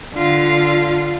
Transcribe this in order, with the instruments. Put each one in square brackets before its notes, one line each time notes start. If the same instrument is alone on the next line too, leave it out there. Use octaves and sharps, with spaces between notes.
[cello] D3 F4